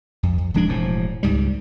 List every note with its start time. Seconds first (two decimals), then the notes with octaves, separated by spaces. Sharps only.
0.23 F2
0.38 F2
0.54 D1 F3 G#3 D4
0.68 E1 A2 F3
1.23 C#2 G#2 G3